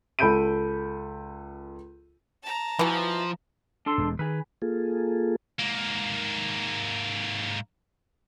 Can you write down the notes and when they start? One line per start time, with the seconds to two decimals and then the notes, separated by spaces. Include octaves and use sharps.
0.19 C#2 A4 B5 G6 D7 D#7
2.43 A5 A#5
2.79 B2 E3 F3
3.86 D4 A4 C6
3.98 E1 E2 G#3
4.19 D#3 G#4 B4
4.62 A#3 F4 G#4 A4
5.59 G#2 A#3